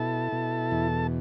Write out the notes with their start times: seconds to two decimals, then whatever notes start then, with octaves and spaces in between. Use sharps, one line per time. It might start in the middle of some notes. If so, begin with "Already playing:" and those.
Already playing: B2 E4 A4 A5
0.32 B2
0.71 E2